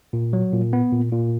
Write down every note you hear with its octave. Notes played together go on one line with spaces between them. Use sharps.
A#2
F#3
A#2
B3
A#2
A#2